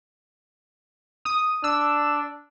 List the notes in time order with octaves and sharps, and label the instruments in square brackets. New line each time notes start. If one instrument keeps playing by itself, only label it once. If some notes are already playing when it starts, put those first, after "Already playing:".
[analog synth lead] D#6
[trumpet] D4 [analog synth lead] E6